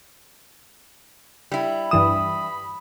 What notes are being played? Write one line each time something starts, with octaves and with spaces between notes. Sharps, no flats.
G3 E4
G2 E3 B5 D#6 E7